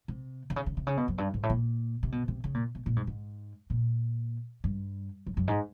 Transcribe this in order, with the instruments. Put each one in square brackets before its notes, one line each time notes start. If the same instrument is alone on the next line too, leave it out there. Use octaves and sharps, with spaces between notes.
[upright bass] C3
C3
C#3
C#3
C3
C#3
B2
F#2
G2
G#2
A2
A#2
C3
B2
C3
C#3
A#2
B2
A#2
G#2
G#2
A#2
G2
F#2
F#2
G#2